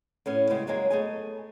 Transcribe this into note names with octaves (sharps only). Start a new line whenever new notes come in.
A2 B3 C#4
C#3 G3 G#3 B3 C#4
F#2 F#3 G#3 A#3 C#5 G#5
A3 B3 G#4 D#5 G#5